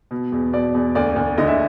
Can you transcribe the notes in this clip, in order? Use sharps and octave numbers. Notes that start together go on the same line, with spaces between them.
B2
E2
B2 D5
E2
D2 D5
D2
D3 D#5
E5